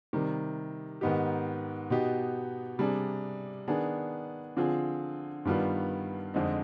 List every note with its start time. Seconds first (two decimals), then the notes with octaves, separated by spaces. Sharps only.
0.13 C3 D#3 G3
1.01 G#2 D#3 B3 D#4 G4
1.90 B2 B3 D#4 G4
2.79 C3 G3 D4 G#4
3.68 D#3 B3 D4 G#4
4.57 D3 F3 C4 F4 G#4
5.45 G2 D#3 G3 B3 F4
6.34 F2 D3 G#3 C4 D#4